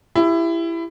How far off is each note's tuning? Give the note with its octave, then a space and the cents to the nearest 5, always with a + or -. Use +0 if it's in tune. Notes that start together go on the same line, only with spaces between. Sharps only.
E4 +20 G4 +15